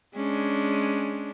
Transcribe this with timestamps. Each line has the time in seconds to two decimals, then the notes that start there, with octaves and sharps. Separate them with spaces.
0.15 G#3 C#4 D4